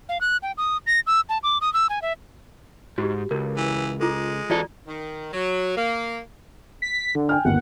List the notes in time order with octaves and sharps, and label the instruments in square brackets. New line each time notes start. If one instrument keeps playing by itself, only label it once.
[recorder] F5
F#6
G5
D#6
A#6
E6
A5
D6
D#6
E6
G#5
E5
[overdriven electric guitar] G#2 [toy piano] F#4 G4
[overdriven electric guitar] C#2 [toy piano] A#4
[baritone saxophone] E3
[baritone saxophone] G#3 [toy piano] F4 G#4 A4
[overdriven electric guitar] E2 A4 [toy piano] F4 F#4 D5
[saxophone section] D#3
F#3
A#3
[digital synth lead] B6
D3
[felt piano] G5 G#5 F6
[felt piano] G1 D#2 [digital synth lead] F#5